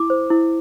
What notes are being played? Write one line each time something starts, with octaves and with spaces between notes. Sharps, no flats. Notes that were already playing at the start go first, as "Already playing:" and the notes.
Already playing: E4 D6
C5
E4